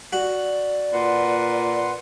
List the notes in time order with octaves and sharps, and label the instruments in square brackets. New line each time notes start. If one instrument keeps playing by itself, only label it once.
[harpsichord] F#4 [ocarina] D5
[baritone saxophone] A#2 [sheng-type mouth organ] B4 F#5 C6